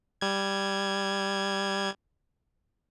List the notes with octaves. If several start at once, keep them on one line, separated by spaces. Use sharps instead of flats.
G3 G#6